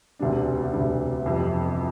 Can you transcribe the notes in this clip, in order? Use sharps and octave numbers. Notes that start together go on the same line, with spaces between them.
E1 D2 C3 G3 D4
E1 D2 C3 G3 D4
G1 F2 C3 E3